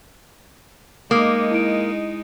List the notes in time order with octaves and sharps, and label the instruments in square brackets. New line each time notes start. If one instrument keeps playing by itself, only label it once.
[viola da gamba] G#3 D#4 [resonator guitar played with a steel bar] A#3 [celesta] D6 D#6
[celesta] E4 D7